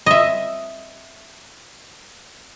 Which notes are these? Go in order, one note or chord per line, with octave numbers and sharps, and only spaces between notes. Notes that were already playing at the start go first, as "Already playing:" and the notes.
D#5 E5